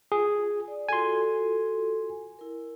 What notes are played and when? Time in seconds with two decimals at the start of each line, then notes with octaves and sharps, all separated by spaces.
0.12 F4 G#4
0.68 D5
0.89 F4 F#4 A4 G#5 C6
2.39 E4 A#4